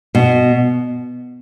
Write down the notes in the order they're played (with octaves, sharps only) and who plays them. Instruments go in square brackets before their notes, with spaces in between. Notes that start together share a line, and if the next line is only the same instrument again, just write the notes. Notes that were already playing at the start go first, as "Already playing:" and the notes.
[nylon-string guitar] B2